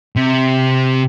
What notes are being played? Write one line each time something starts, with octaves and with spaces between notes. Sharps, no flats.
C3